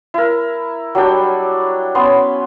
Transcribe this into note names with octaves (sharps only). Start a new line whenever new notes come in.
E4 A#4
F#3 G3 D4 G5
B3 C#4 B5 C6